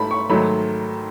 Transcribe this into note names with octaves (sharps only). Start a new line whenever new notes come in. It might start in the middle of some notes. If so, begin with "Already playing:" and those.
Already playing: G#2 A3 A5 B5
C#6
G#2 D#3 F#3 A3 B5